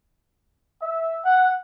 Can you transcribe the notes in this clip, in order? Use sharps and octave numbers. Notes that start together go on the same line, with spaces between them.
E5
F#5